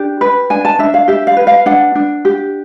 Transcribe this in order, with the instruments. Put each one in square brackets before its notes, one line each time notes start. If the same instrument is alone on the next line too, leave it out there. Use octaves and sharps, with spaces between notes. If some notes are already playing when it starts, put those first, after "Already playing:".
Already playing: [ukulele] D4 G4
B4
D4 G#5
A5
D4 E5
F5
G4 E5
F5
B4
F5
D4 F#5
D4
G4